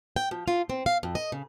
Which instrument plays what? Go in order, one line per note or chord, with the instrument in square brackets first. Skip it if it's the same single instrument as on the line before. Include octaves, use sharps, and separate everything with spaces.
[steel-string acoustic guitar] G5
F3
F4
C4
F5
F2
D#5
C#3